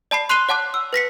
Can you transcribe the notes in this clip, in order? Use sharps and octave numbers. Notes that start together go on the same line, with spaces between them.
D5 A5 B5 C7
C6 F#6 C7 D#7 F7 G7
C#5 F#5 A5 D6 F#6
E6
B4 A#6 B6 C#7